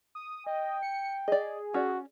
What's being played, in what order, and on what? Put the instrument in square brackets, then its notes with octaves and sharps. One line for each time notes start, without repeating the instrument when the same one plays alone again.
[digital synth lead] D#6
[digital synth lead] D#5 [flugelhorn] G5
[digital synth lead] C#7
[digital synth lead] G#4 [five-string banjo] D5 D#5
[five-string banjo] C#4 D5 [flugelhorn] F#4